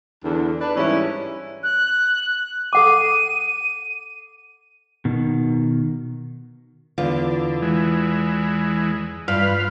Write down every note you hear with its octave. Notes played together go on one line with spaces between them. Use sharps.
E2 D3 D4
D4 B4
G#2 E3 G3 C#4 E4
F#6
A4 F#5 D6 D#7
B2 D#3
E2 D3 F4
E3 G#3
G2 F4 B4 F5